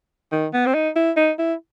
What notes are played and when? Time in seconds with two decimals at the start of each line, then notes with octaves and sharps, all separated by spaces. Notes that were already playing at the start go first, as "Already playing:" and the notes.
0.32 D#3
0.54 B3
0.66 C4
0.74 D#4
0.96 E4
1.17 D#4
1.39 E4